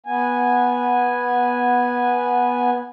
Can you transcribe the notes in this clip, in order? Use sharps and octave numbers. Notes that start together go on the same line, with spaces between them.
B3 G#5